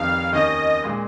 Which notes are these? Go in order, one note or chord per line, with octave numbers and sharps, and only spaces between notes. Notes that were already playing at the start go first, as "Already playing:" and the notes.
Already playing: F1 F2 D#3 F5
D#2 D#3 A#3 C#4 D#5
A#2 G#3